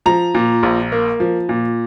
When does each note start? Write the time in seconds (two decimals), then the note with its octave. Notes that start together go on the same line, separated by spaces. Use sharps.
0.06 F3 A#5
0.35 A#2
0.63 A#1
0.92 A#3
1.20 F3
1.49 A#2